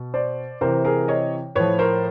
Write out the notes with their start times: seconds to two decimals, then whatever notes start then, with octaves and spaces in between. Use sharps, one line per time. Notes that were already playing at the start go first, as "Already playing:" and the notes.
Already playing: B2
0.14 C5 D5
0.61 C3 E3 A#4 C5
0.85 G#4 A#4
1.08 C#5 D#5
1.55 A2 F3 B4 C#5
1.79 A#4 C5